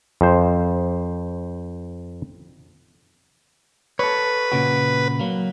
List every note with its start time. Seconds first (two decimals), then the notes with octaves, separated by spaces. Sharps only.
0.21 F2 C5
3.99 A4 B4 C#5
4.52 A#2 C#3 F#4
5.20 F#3 A#3